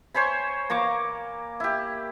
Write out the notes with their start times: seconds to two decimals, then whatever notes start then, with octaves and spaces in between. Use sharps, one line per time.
0.14 C5 C#5 G#5 B5
0.70 A#3 A#5 C#6 D6
1.60 E4 G4